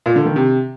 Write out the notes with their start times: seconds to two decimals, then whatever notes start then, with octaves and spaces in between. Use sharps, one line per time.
0.06 A#2
0.16 D3
0.26 D#3
0.36 C3